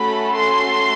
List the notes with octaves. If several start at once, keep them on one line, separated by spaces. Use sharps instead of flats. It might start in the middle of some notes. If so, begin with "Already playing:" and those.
Already playing: A3 C#4 F#4 A4 B5
C6